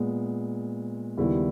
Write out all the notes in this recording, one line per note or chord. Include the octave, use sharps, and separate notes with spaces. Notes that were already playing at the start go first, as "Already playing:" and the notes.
Already playing: A#2 G#3 B3
D#2 C#3 G3 B3 E4